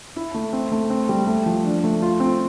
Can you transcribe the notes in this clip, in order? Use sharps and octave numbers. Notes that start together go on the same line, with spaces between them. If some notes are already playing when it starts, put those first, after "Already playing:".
E4
A3
C4
A3
C4
G3
A3
F3
D4
A3
F4
C4